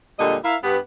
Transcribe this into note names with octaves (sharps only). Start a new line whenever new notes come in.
A#2 D3 G3 G#3 G4 D#5
E4 A#4 E5 F5
G2 B3 G4